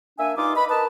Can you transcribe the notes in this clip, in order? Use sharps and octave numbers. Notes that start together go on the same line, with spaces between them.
A#3 D4 E5 G#5
G2 D#4 F4 D#5 D6
B4 D#5 B5
A#4 B4 D#5 A5